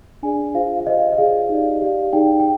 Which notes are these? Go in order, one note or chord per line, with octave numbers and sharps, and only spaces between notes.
D4 G#4 D5 G#5
F4 G#4 C5 F5
F5
G4 C5 D#5
D#5
F4 G#4 D5 F5
D#4 G4 D5
G4 D5 F5
D#4 G#4 D5 G5
G5